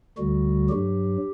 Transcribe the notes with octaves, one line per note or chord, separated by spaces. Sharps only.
D2 D3 G3 F#4
G2 F#3 G4